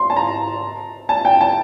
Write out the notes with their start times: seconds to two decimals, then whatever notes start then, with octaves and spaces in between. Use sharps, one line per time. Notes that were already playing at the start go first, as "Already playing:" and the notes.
Already playing: C6
0.10 A5
0.16 A#5
1.09 A5
1.25 G5
1.41 A5